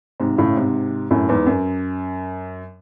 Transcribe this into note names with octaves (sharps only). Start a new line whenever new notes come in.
G#2 C3
A2 C#3
G#2 C3
F#2 A2
E2 G#2
F#2